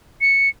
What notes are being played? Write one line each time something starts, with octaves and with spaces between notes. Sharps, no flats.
C#7